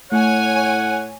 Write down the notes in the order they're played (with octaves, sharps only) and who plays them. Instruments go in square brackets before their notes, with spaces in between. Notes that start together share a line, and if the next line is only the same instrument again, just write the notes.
[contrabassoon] A2 [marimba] A3 [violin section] C#5 G#5 [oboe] F#5